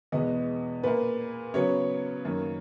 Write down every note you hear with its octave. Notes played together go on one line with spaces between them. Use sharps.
E2 B2 G#3 B3 D#5
A#2 A#3 B4
C#3 F#3 B3 C#5
F#2 D#3 A#3